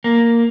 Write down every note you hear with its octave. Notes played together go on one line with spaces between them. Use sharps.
A#3